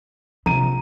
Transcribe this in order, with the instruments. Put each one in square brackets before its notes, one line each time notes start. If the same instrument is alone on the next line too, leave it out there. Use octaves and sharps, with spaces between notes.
[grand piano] A#1 D#7 [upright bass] C3 [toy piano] A#5